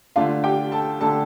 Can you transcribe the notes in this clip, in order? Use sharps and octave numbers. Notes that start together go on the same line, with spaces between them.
D3 A3 D4 F4 F5
G4 G5
A4 A5
D3 A3 D4 A4 A5